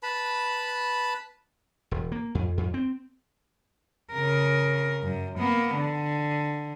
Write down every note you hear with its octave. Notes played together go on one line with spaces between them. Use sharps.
B4 A5 B5
E1
A#3
F2
F2
C4
C#3 A#4
F#2
A#3 B3
D3